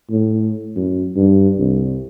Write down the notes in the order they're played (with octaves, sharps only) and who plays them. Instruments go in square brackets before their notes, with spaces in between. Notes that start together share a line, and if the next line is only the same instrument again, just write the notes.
[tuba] A2
F#2
G2
C2